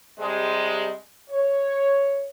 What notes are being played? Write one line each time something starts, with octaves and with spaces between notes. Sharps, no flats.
C3 G3 G#3
C#5